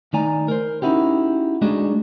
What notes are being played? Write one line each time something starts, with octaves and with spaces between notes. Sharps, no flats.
D#3 A3 D#4 D5 G#5 A#5
A#4 C5
C#4 D#4 E4 F#4 G4
G#3 A3 D4 D#4 F#4 G#4